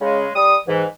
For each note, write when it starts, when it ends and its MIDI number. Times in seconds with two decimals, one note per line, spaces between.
0.02 0.29 49
0.02 0.29 56
0.36 0.56 55
0.36 0.56 87
0.68 0.85 44
0.68 0.85 52